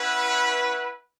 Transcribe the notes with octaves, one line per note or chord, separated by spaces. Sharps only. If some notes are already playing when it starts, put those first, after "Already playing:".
Already playing: C#4 E4 B4 F#5